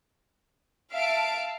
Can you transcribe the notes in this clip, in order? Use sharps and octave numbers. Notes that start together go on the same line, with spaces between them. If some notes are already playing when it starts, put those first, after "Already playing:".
E5 F5 A5 D7